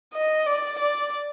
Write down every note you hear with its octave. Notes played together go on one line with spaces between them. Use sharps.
D#5
D5
D5